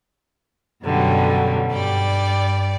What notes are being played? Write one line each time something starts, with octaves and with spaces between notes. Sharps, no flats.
F#2 B2 D3 F#3 G3
G2 G3 D5